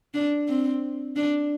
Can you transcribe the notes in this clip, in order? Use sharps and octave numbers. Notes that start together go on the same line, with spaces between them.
D4
C4
D4